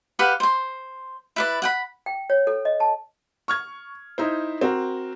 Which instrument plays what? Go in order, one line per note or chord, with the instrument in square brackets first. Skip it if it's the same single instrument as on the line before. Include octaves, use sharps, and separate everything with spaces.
[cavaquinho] G4 B4 F5 F#5
C5 C6
E4 B4 D5
F#5 G5 B5
[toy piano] G5
C#5
A4
D#5
A5
[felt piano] C#6 F6 G#6
D#4 E4 C5
C4 F#4 A#4